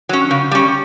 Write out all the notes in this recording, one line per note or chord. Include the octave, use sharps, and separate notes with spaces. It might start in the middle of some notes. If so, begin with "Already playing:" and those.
F#3 C#4
C#3
G3 C#4